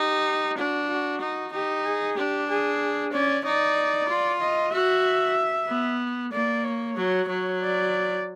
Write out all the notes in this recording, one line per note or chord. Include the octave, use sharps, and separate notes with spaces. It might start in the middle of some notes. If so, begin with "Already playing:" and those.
Already playing: D#4 G4
D4 F#4
F#4
D#4
D#4 G4
G#4
D4 G4
G#4
C#4 D5
D#4 D5
F4
D#5
F#4 E5
B3
A#3 D5
C#5
F#3
F#3
D5